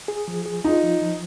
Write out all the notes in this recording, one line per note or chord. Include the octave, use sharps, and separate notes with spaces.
G#4
F3
G#4
D#4 F4
F3
F3